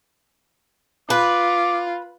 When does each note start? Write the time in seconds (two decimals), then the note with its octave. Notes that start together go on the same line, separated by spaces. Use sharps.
1.10 F4 B4 D6